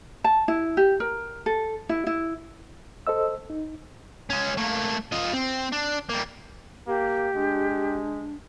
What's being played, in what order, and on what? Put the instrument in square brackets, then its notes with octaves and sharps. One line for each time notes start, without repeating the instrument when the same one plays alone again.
[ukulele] A5
E4
G4
A#4
A4
E4
E4
[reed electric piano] A4 C5 D#5 E6
D#4
[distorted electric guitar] G#3 C#4
A3 A#3
F4 D#5
C4
D4
G3 A#3
[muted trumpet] A#3 [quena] G4
[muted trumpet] G#3 [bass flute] D4